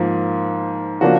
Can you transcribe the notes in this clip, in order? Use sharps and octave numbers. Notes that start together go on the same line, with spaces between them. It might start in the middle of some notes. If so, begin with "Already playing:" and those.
Already playing: G#2 F3 A#3
C#3 F3 A#3 D4 F#4